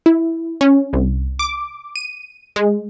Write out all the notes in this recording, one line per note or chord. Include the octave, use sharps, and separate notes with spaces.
E4
C#4
C2
D6
D#7
G#3